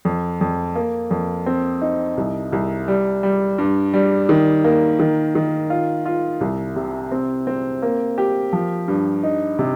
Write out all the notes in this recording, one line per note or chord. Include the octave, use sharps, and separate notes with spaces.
F2
F2
A#3
F2
C4
D#4
C2
C2
G3
G3
G2
G3
D#3
A#3
D#3
D#3
F4
F4
C2
C3
C4
C4
A#3
G4
F3
G2
D#4
C3